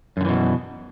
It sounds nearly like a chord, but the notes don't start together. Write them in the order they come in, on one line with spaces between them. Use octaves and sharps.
F#2 D3 E3 B2